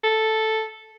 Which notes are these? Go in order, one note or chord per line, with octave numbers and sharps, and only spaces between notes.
A4